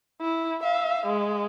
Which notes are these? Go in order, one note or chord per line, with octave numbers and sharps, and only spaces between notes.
E4
E5 F5
G#3